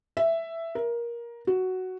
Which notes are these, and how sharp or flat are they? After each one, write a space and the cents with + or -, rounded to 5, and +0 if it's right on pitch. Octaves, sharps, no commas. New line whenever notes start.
E5 +5
A#4 +15
F#4 +5